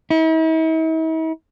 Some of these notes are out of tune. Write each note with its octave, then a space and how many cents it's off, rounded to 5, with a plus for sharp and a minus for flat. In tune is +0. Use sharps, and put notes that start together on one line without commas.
E4 -45